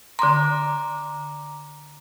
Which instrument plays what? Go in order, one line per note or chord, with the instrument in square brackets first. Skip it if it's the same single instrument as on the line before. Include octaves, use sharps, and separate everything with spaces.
[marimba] D3 C6 [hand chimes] A#5 D6